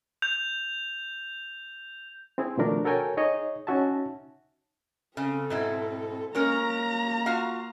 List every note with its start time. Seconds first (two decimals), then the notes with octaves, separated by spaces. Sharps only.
0.22 G6 F7
2.38 C4 E4 G#4
2.58 B2 D#3 F3 A3 D4 A#4
2.85 F#4 A4 A#4 C#5 G5 G#5
3.17 D#4 G#4 C#5 D#5
3.67 C#4 D#4 F#4 E5 A5
5.17 C#3 C4 A4
5.50 G#2 B2 E4
6.35 G#3 A#3 C#4 A#4 A#5
7.26 F4 F#4 F5